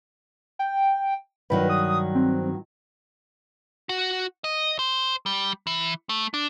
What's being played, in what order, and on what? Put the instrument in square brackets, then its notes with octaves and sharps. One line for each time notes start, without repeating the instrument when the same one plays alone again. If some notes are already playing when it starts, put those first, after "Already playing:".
[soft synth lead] G5
[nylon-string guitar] G2 D#3 F#3 [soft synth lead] B4
[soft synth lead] D#6
C4
[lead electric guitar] F#4
D#5
C5
G3
E3
A3
D4